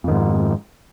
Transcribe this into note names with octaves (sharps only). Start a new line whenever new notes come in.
F2 G#2 D#3